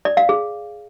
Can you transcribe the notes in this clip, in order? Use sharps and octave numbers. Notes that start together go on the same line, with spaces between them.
D5
F5
G#4